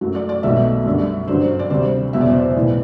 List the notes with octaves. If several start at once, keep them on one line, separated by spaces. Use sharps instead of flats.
F#2 F#3 A3
D5
D5
B1 B2 F#3 A3 E5
F#2 D3 G3
A1 G2 D3 F#3 C5
D5
D2 C3 G3 C5
F#1 E2 B2 F#3 E5
D5
C5
D5
B1 A2 E3